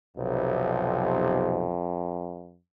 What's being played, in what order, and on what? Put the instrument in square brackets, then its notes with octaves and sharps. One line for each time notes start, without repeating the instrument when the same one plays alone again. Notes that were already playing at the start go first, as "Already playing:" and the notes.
[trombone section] B1 C3 [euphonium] F2